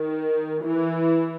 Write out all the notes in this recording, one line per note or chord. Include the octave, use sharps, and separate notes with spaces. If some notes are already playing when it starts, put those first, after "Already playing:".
Already playing: D#3
E3